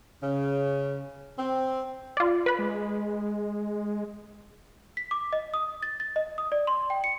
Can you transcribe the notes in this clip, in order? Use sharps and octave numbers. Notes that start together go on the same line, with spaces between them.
C#3
C4
F4 D5
B4 B5
G#3
B6
D6
D#5
D#6
A6
A6
D#5
D#6
D5
C6
G5
C#7